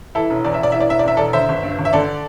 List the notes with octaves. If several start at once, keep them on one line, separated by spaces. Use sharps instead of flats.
E3 E4 A4
E1
E2 D5
E5
E1 D5
E3 E5
D5
E1 E5
D5
E2 E5
E1 A4 D5
D3 C5 E5
G1
G2
G1
E5
D3 A4 D5